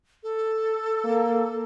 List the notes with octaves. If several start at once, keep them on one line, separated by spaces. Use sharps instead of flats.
A4
A#3